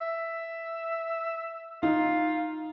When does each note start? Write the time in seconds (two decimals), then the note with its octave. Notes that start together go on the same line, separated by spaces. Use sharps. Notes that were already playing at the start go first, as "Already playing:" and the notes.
0.01 E5
1.83 D#4 F4